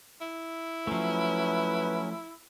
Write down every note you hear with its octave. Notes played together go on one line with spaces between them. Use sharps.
E4
F3 F#3 A3 C#4 B4